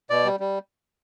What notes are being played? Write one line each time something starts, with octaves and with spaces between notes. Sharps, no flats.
B2 D5
G3
G3